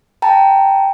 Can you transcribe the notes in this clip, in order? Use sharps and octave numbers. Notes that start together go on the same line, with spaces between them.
G5 A5 A#5